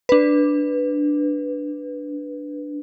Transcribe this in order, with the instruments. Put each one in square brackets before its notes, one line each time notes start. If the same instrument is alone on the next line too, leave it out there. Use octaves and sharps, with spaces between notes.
[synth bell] D4 B4